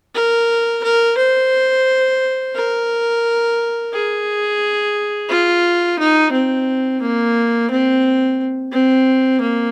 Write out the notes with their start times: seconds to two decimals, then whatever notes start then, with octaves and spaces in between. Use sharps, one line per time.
0.15 A#4
0.83 A#4
1.17 C5
2.55 A#4
3.93 G#4
5.29 F4
5.99 D#4
6.32 C4
7.02 A#3
7.70 C4
8.72 C4
9.41 A#3